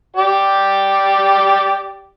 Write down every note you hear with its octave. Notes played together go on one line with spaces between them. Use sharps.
G4 D5